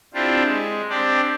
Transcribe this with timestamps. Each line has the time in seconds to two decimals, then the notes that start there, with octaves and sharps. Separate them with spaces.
0.14 C4 D4 E4 F4 G4
0.44 G#3
0.89 C4 D4 G4 D5